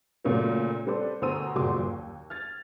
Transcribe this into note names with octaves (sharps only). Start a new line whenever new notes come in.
A#2 C#3 F#3 A3 B3
G3 C4 A4 B4 C5 D5
D2 B2 C5 A#5 E6 D#7
F#1 A#2 G3 F#4 C6 D6
D#2
F6 G#6 A6